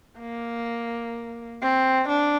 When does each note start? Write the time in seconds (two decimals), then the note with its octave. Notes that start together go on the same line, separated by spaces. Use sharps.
0.19 A#3
1.62 C4
2.09 D4